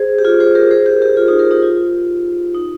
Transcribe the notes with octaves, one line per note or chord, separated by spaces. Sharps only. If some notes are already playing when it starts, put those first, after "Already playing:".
Already playing: G#4 C5
G4
F4 G#4
G#4 C5
G4 A#4
G#4 C5
G4 A#4
G4 A#4
F4 G#4
D#4 G4
G4 A#4
D#4 G4
F4
D#4